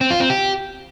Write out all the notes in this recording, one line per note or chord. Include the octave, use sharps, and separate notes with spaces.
C4
F4
C4
G4